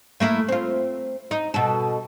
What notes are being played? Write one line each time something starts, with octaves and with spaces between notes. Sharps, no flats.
A3 A#3 E4
C4 F4
D#4
B2 A4